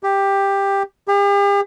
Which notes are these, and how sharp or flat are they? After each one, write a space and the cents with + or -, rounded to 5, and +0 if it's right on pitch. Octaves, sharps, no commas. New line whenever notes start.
G4 +10
G4 +45